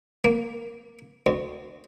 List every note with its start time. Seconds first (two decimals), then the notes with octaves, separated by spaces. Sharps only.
0.24 A#3
1.26 D2